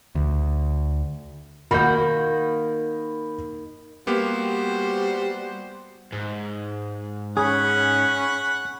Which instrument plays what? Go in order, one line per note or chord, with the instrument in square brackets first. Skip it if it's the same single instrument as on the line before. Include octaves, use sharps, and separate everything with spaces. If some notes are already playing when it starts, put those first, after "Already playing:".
[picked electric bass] D2
[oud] D#3 A#3 F#4 [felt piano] B5 G6
[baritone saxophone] G3 [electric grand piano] A#3 B3 G4 [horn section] F#4 C5
[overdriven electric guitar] G#2
[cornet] C#4 [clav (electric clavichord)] G#4 [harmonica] F#5 B5 C#6